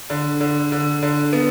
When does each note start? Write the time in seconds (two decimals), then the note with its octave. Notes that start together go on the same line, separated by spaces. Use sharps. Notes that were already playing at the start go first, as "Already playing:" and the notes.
0.10 D3
0.41 D3
0.72 D3
1.03 D3
1.33 B3